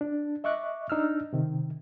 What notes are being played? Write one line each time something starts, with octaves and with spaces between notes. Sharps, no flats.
D4
D#5 E5 C#6 D6 F#6
D4 D#4 E6 F6
C3 D#3